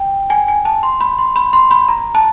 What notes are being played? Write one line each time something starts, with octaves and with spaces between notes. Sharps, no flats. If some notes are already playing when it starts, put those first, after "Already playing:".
Already playing: G5
G#5
G#5
A5
C6
B5
C6
B5
C6
B5
A#5
A5